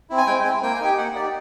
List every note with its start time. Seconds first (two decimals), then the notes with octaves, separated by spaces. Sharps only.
0.10 C4 E4
0.18 G#5
0.27 G#3 G5
0.45 C4 E4 G#5
0.63 A#3 G5
0.74 G#5
0.80 D#4 G4 G5
0.98 A#3 F#5
1.16 D#4 G4 D5